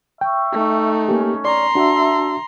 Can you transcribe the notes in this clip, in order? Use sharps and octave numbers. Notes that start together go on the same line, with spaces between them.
E5 G5 C#6
A3 D#4
A#3 C#4 G4
D5 A#5 C6
D4 F#4 A4 E5